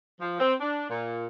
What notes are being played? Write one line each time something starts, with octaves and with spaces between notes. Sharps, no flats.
F3
C4
D4
A#2